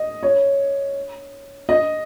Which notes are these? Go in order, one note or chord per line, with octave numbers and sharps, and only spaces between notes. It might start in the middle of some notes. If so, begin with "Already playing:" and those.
Already playing: D#5
C#5
D#5